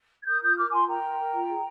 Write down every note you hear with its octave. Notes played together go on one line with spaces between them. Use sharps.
G#6
A#4 D#6 G6
F4 D#6 G6
A#4 D6 F6
D6
F4 G#5 C6
A#4 G5 A#5
A#4
A#4
F4
G#4